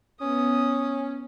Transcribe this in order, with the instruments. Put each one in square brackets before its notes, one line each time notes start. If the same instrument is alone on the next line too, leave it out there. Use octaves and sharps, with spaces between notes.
[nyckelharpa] B3 D#6 [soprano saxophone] C#4